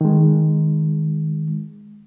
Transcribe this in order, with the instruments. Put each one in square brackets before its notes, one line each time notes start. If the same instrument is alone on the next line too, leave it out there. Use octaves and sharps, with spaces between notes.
[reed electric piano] D#3 G#3